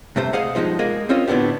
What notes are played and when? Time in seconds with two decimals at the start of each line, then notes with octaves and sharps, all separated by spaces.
0.16 G2 C3 A3 C5
0.33 G#4 C5 D#5 F5 F#5
0.55 G2 F3 G#3 C4 D#4
0.79 G#3 A#3 G#4 D#5
1.09 C4 C#4 F4 C5 D#5
1.28 A2 D3 B3 D4 G4